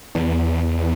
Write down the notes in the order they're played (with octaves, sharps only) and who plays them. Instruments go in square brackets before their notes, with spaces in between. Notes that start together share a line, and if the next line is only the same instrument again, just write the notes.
[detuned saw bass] E2